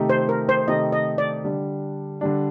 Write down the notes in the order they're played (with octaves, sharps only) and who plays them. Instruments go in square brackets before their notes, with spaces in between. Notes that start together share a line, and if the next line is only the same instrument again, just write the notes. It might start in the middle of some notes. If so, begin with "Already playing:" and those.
Already playing: [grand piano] C3 D#3 A3 D#4 G4
[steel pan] C5
A#4
C5
[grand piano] C3 D#3 A3 D#4 G4 [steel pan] D#5
[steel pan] D#5
D5
[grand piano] D3 G3 D4
D3 G3 D4